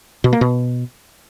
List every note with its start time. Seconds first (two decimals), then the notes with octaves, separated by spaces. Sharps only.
0.24 B2
0.33 A#3
0.41 B2